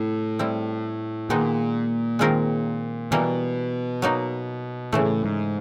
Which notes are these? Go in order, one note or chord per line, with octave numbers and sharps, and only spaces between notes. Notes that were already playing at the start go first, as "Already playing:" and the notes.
Already playing: A2 C3
G3 C4 E4
A#2 D#3 G#3 B3 D#4
D#3 G#3 C4 F4 A#4
B2 E3 G3 A#3
F#3 A#3 D#4
A2 C#3 E3 A3
G#2